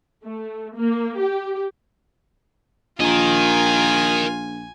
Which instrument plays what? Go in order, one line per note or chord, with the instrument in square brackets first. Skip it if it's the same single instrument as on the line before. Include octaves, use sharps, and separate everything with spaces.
[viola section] A3
A#3
G4
[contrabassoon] A#1 [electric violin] F4 [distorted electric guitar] A#4 D#5 [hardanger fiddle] G#5